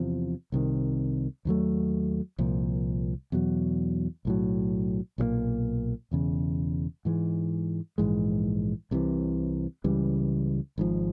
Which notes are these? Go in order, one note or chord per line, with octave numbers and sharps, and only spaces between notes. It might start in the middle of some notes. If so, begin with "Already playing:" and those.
Already playing: E2 C3 F3
C2 C3 D#3
D#2 D3 F#3 A3
C2 A#2 F3
E2 B2 F#3
B1 A2 F#3
B1 A#2 F#3 A#3
E1 E2 C#3
G#2 E3 G#3
A#1 G#2 E3 G#3
C2 C3 E3
C#2 C#3 E3 G3
G#1 G#2 F3